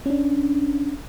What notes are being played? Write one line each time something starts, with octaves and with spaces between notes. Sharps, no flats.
C#4 D4